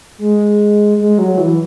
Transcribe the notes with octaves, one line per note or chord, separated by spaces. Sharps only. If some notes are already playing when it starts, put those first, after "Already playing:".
G#3
G#3
F#3
E3